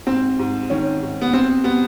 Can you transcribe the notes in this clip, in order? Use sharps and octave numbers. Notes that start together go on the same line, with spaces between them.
G#2 C4
G#2
D#3 C#4
G#2
B3
G2 C4
G3 B3